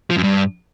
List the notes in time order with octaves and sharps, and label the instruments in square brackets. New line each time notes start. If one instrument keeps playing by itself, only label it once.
[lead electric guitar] F3
F#2
G2